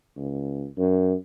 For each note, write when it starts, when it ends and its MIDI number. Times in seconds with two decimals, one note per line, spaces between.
0.16 0.66 37
0.78 1.15 42